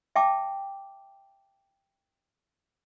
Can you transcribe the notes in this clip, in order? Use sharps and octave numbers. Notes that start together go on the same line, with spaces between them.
E5 G5 A5 D6